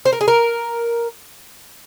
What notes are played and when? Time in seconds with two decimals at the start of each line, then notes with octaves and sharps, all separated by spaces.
0.05 C5
0.12 A#4
0.21 G#4
0.28 A#4